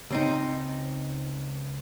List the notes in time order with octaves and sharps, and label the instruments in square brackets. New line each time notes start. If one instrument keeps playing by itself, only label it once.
[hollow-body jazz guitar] C#2 C4 D#4